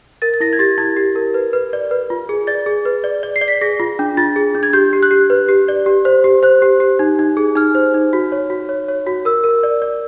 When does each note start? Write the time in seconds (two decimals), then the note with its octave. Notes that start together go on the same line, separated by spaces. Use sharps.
0.22 A#4 A6
0.34 A6
0.40 E4 A#6
0.53 G#6
0.59 G4 A6
0.78 E4 G#6
0.97 G4
1.15 A#4
1.34 B4
1.53 B4
1.73 D5
1.91 B4
2.10 F4
2.29 G#4
2.47 D5 A6
2.66 G#4
2.85 B4
3.04 D5
3.23 D5
3.36 C7
3.41 D5
3.48 B6
3.61 G#4 A#6
3.80 F4
3.99 D4
4.17 F4 A6
4.36 G#4
4.55 D4
4.63 G#6
4.73 G4 G6
4.93 G4
5.03 F#6
5.11 G4
5.30 B4
5.49 G4
5.68 D5
5.86 G4
6.05 C5
6.24 G4
6.43 C5 F#6
6.62 G4
6.80 G4
6.99 D#4
7.19 D#4
7.37 G#4
7.56 D#4 F6
7.75 C5
7.94 D#4
8.13 F#4
8.32 C#5
8.50 F#4
8.69 C#5
8.88 C#5
9.07 F#4
9.25 A#4 E6
9.44 A#4
9.63 D5
9.82 D5